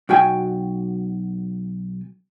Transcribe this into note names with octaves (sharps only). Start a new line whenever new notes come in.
B1 F#4 G5 G#5